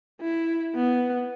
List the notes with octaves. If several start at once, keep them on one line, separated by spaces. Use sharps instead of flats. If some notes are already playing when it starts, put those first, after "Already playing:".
E4
B3